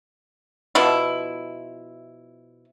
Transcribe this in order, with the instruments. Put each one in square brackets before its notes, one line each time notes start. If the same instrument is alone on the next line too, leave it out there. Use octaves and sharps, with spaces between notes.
[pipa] B2 F3 E4